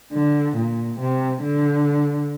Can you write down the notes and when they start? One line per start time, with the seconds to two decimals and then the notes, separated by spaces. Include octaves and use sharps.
0.13 D3
0.57 A#2
1.00 C3
1.42 D3